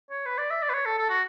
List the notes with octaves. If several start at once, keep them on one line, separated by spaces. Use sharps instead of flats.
C#5
B4
D5
E5
D5
B4
C#5
A4
A4
F#4